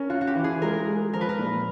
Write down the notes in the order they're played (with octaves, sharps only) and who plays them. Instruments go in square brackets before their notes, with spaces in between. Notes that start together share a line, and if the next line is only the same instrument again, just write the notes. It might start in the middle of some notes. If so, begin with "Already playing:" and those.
Already playing: [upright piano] C#4 [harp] A#4
[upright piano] F4 [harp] F#4
[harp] F#4
G4
[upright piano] E3
[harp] G#4
[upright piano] G#3 [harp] A#4
[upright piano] G#3
[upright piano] F3 [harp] A#4
[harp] B4
A#4
[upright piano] A#2